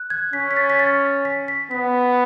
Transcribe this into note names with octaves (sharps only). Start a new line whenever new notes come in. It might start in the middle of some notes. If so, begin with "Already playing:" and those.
Already playing: F#6
G#6
C#4 B6
B6
A6
B6
A6
B6
B6
B3 B6